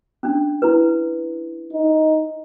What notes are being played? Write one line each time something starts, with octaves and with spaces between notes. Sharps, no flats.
C#4 D4
E4 B4
D#4